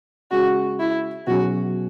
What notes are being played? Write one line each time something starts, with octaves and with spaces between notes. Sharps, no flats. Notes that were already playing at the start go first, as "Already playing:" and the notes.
C#3 G#3 C#4 F#4 G#4
E4
B2 F#3 C#4 F#4 G#4